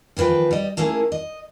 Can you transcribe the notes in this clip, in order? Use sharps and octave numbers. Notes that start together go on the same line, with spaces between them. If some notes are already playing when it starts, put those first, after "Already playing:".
D#2 E3 F3 B4 G5
G3 D#5
A3 A#3 C#4 E4 G#4
D#5